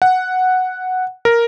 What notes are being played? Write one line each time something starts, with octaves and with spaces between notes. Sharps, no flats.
F#5
A#4